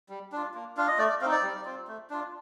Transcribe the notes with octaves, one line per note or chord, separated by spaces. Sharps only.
G3
D4 F4
A#3
D4 F4 F5
D#5
A3 D5
D5
C4 D#4 F5
D5
G3
C4 F4
A3
D4 F4